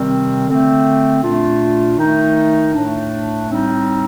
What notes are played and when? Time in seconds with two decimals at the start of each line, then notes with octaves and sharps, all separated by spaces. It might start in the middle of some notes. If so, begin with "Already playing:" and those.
Already playing: C3 D#3 G3 C4
0.46 D3 A3 C4
1.22 A#2 A3 D4 F4
1.98 D#3 A3 D#4
2.74 A2 A3 D4
3.49 A2 G3 C4 D#4